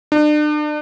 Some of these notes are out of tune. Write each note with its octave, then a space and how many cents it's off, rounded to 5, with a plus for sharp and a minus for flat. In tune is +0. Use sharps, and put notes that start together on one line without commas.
D4 +40